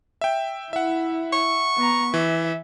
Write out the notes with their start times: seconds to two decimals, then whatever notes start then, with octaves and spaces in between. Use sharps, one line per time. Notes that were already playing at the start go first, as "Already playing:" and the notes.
0.21 E5 G5
0.73 E4 E5 F#5
1.33 C#6
1.77 B3 A#5
2.14 E3 E5